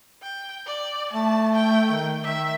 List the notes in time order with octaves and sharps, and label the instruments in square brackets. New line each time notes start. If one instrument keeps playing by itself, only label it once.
[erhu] G5
D5
[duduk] A3 [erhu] A5
[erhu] G5
[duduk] D#3
[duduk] D#3 [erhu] E5